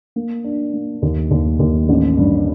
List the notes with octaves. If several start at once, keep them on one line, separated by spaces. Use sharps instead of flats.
A#3
D4
A#3
D#2
D#2
D#2
A1
G2